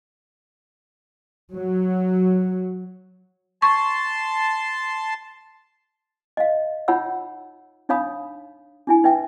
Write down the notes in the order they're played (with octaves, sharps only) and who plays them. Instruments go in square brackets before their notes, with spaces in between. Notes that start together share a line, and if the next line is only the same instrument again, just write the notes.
[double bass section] F#3
[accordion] A5 C6 [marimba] C#6
[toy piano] D#5 F5
D#4 F4 C#5 F#5 B5 E6
D4 D#4 C#5 F5 B5 D#6
D4 E4 G#5
D#4 B4 E5 G5